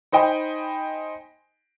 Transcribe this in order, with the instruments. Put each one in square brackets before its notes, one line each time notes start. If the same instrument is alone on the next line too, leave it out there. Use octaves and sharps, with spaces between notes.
[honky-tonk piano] D#4 C5 D#5 G5 G#5 B5